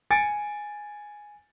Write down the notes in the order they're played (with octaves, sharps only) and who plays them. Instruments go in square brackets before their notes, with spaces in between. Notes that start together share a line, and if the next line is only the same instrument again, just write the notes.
[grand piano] G#5 A6 C#7 D7